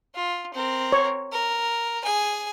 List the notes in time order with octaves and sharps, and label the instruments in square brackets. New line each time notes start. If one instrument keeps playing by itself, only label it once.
[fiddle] F4
C4 A#4
[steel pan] C#5
[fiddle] A#4
G#4 G#5